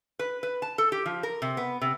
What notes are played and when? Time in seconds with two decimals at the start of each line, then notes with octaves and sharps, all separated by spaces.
0.19 B4
0.43 B4
0.62 A5
0.78 A4
0.92 G4
1.06 F3
1.23 A#4
1.42 C3
1.57 B3
1.81 C3